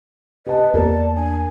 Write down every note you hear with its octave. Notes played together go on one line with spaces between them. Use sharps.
G4 B4 D#5 A5
E2 A#3 G4 A#4 D5 A5
D4 G#5